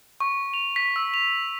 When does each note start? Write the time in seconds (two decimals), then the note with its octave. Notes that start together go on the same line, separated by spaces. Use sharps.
0.20 C#6
0.54 F7
0.76 B6
0.96 E6
1.14 F7